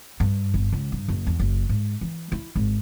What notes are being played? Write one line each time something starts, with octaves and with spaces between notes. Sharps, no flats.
G2
G1
C#2
G2
F#1
E2
F#1
G#2
E3
E4
G#1